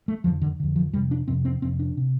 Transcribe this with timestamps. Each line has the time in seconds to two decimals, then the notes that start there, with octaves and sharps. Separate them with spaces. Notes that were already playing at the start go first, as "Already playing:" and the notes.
0.08 A3
0.24 F2 D3 F3
0.42 D3
0.60 F2 D3
0.76 F3
0.93 F2 C3 G3
1.11 D4
1.28 F2 C3 C4
1.45 C4
1.62 F2 C3 C4
1.79 D4
1.97 C3